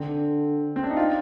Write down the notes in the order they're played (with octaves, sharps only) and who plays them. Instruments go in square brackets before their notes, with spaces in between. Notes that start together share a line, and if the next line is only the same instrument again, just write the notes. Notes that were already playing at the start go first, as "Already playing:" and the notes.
Already playing: [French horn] D3 [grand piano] C4
[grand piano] C4
D4
D#4
F4